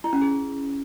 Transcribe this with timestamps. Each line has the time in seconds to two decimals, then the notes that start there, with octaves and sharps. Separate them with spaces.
0.04 E4
0.13 C#4
0.22 G#4